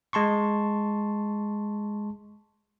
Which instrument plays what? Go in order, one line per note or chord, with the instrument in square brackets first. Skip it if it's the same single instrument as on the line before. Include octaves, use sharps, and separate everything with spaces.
[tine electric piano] G#3 A5 C6 C#6